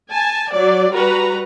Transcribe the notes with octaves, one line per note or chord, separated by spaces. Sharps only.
G#5 A5
F#3 D5
G3 F#4 B4 A#5